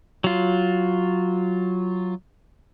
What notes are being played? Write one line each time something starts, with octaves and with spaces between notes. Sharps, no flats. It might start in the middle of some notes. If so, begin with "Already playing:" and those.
F#3 F4